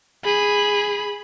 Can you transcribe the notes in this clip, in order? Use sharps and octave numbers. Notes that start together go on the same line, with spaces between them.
G#4 B5